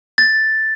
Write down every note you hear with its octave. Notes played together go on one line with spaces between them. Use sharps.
A6